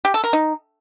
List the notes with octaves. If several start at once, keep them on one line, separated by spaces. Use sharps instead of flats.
G4
A4
A#4
D#4